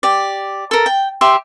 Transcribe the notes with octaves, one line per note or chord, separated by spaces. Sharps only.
G4 D5
A4 A#4
G5
G4 E5 C6